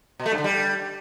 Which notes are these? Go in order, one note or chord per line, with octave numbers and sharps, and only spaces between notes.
B2
A3
G2
D3
G3